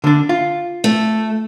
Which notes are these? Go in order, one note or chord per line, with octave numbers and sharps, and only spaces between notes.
D3 D4
F4
A3